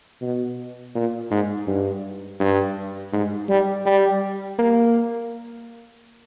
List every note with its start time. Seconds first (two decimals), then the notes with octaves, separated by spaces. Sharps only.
0.22 B2
0.95 A#2
1.31 G#2
1.67 G2
2.40 G2
3.13 G#2
3.49 G3
3.86 G3
4.59 A#3